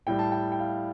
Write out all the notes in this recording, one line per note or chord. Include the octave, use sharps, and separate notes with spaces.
A2 G3 G5
A5
G5
G5
F5